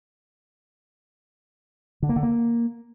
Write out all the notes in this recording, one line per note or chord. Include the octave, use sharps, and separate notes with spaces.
D3
A#3
D3
A#3